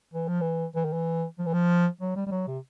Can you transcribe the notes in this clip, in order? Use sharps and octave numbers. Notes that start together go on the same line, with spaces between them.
E3
F3
E3
E3
D#3
E3
F3
E3
F3
F#3
G3
G3
F#3
C3